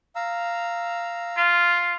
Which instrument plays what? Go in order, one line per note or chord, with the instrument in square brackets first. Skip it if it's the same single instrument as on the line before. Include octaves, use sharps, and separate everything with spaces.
[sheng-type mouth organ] F5 A#5 E6
[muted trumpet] F4